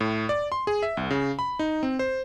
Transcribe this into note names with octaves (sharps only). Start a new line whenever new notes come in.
A2
D5
C6
G#4
E5
C2
C#3
B5
D#4
C4
C5